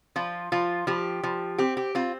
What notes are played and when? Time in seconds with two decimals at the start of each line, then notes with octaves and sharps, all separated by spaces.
0.16 F3 F4
0.52 F3 F4
0.87 F3 G4
1.23 F3
1.58 C4 G4
1.77 G4
1.95 C4 F4